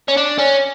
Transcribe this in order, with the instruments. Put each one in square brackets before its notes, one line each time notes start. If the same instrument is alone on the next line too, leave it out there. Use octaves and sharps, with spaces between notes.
[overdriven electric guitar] C#4
D4
C#4